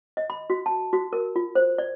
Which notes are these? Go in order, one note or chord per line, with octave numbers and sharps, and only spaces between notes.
D#5
B5
F#4
A5
F#4
A#4
F4
C5
D5